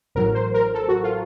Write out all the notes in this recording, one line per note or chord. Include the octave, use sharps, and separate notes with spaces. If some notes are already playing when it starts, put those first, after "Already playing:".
A1 A2 F#3 A#4
C5
A#4
A4
F#4
F4